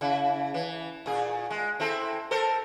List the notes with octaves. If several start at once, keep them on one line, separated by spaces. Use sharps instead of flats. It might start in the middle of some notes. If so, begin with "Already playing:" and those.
C#3 E4
E3
A#2 G#4
G#3
C4 E4 A4
A4 A#4 C5